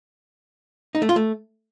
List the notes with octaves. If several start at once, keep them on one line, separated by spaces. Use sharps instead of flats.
D#4
A3
F4
A3